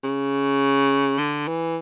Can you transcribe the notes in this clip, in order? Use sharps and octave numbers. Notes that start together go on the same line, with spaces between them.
C#3
D3
E3